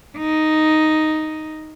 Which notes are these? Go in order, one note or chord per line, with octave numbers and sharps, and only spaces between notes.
D#4